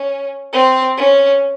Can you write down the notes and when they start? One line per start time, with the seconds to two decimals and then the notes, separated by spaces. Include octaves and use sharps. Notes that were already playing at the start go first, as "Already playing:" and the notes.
Already playing: C#4
0.53 C4
0.97 C#4